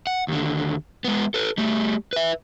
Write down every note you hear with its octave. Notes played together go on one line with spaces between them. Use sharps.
F#5
D#2 D3
G#3 B3
A4 B4
G3 A3
B4 E5